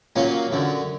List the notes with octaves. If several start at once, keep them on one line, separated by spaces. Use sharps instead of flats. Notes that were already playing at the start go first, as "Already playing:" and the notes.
A#2 F#3 A#3 C#4 F4
F#2 D3 F#3